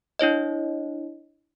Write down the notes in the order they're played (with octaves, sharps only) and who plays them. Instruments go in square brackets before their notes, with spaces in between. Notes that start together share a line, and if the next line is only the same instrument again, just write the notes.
[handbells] D4 E4 C#5 D#5